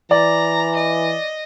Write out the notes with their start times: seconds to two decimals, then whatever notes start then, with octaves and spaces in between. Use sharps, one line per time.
0.11 E3 D5 A#5
0.76 D#5